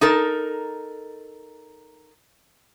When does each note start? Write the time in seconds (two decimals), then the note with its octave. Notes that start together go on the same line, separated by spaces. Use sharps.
0.01 D#4 A4 A#4